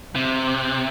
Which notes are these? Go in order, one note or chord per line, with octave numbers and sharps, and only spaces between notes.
C3